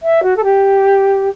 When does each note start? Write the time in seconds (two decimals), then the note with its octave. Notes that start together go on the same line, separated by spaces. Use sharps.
0.02 E5
0.23 F#4
0.36 A4
0.43 G4